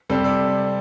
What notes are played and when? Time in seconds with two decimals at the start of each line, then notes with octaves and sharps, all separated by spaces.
0.09 C3 G3 C4 A4 D5
0.24 A4 D5